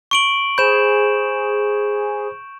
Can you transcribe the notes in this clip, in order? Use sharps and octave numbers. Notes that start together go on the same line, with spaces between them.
C#6 D7 F#7
G#4 C5 B5 G6 E7